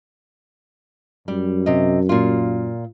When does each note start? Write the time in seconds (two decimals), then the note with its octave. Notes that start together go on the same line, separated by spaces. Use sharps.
1.28 F#2 G3
1.66 C3 D#5
2.09 A#2 F4